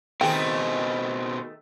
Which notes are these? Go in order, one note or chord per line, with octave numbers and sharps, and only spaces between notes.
B2 D#3 A3 C4 G#4 G5